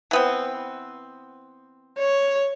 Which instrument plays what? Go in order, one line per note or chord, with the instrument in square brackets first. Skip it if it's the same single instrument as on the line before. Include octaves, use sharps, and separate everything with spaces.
[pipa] E3 B3 C4
[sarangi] C#5